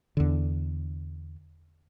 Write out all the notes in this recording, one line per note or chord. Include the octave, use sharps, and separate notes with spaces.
E2 D3